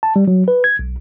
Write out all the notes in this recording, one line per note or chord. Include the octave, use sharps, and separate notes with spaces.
A5
G3
F#3
B4
G#6
B1